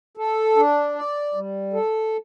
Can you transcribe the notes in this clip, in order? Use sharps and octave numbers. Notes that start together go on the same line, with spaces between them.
A4
D4
D5
G3
A4